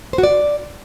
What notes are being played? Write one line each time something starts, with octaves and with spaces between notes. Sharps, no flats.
C5
F#4
D5